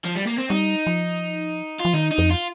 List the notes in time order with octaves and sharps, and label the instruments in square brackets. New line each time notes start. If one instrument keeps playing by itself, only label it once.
[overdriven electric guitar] F3
G3
A#3
C4
[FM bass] G3 [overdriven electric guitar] D#4
[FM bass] F3
[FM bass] F3 [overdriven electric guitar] F4
[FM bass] D#3 [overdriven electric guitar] D#4
[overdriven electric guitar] D#4
[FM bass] F2
[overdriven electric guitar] F4